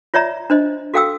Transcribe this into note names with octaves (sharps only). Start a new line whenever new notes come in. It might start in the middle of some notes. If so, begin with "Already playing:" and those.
F4 C#5 D5 E5 A#5
D4 C5 D#5
F#4 A4 F5 G5 D#6 E6